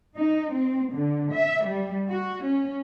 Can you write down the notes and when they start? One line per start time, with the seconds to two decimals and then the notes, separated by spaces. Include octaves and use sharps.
0.16 D#4
0.52 C4
0.92 D3
1.32 E5
1.65 G3
2.08 F#4
2.43 C#4